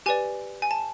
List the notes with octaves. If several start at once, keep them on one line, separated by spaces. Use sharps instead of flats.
G4 B4 D5 G#5
G#5
A5